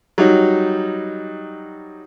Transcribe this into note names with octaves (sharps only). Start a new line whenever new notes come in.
F#3 G3 D#4